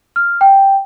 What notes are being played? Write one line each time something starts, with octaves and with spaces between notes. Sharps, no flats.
F6
G5